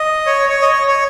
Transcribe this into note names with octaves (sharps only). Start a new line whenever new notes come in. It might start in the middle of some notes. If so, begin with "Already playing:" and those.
Already playing: D#5
C#5
C#5
D#5
C#5
C#5